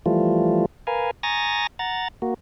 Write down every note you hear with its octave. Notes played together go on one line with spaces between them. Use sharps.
E3 F3 G3 A3 F4
A#4 B4 F5 G#5
G#5 A#5 C#6 D#6 A6 A#6
F#5 A#5 A6
A#3 F#4